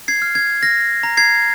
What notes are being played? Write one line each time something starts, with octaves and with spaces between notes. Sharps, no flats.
G#6 C7
F6
G#6
F6 A#6
A#5
G#6 C7